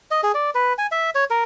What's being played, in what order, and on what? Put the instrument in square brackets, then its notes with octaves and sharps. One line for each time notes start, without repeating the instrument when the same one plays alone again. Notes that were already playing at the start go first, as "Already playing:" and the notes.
[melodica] D#5
G#4
D5
B4
G#5
E5
C#5
A#4